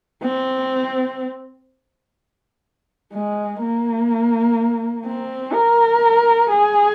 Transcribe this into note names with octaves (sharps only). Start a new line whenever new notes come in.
C4
G#3
A#3
C4
A#4
G#4